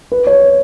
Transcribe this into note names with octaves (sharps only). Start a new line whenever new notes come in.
B4
C#5